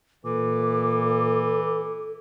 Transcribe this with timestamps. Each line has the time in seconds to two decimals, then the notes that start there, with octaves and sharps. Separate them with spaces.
0.25 A#2 E3 A4 D6